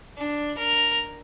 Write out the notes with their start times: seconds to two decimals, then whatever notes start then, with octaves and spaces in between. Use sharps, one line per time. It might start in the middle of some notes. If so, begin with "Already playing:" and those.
0.18 D4
0.58 A#4